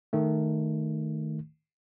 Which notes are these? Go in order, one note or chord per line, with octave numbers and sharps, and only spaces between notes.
D#3 A3